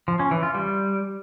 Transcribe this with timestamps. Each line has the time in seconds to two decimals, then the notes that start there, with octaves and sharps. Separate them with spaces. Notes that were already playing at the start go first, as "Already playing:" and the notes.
0.08 F3
0.20 C#4
0.31 E3
0.43 F4
0.54 G3